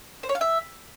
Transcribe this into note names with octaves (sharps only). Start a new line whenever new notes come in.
C5
C#5
F5
E5